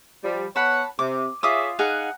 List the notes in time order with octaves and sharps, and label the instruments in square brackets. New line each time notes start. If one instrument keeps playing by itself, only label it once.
[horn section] F3 G3
[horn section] B3 C#5 F#5 [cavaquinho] A5 B5
[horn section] C3 [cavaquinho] D6
[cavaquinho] F4 D6 D#6 [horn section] G#4 C#5 E5
[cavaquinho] D#4 G#4 F5 [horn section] F#5